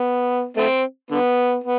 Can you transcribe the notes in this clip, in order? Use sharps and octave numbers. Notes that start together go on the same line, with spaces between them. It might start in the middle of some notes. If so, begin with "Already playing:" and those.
Already playing: B3
A3 C4
D3 B3
B3